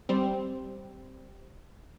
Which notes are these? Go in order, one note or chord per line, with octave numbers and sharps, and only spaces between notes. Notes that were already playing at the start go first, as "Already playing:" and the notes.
G3 C4